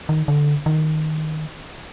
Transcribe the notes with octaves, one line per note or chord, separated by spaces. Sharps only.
D#3
D3
D#3